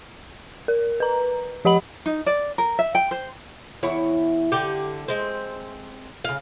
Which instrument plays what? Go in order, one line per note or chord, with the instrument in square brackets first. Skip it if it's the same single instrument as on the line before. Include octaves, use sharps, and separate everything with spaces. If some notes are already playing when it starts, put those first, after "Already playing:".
[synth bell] A#4
B4 A#5
F3 G4 D#5 F#5 B5 F#7
[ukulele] D#4
D5
A#4
E5
G5
C5
[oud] E2 E4 C#5
D3 G4
G#3 C4
C#3 F5